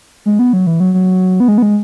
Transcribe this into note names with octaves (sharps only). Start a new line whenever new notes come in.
G#3
B3
F#3
E3
F#3
F#3
B3
G#3
B3
G#3